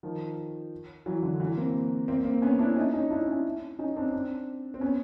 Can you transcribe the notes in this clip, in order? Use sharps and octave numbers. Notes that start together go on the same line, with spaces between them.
D#3 F3
E3 F#3
D3 E3
E3 F#3
A#3 C4
A#3 C4
A#3 C4
B3 C#4
D4 E4
C#4 D#4
C#4 D#4
D4 E4
C#4 D#4
C#4 D#4
C4 D4
C4 D4
C4
B3 C#4